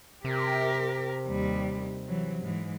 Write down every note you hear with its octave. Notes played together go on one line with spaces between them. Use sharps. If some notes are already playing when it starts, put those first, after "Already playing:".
C3 G4 A#4
D#2 G3
E3 F#3
G#2 E3